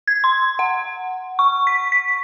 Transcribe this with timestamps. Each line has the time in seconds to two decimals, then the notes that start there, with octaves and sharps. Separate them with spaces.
0.08 G#6
0.24 C6
0.59 F#5
1.39 C#6
1.67 B6
1.92 B6